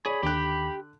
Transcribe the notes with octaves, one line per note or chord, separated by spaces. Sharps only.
G#4 C#5 D5 B5
D#2 D3 G4 G5 F#6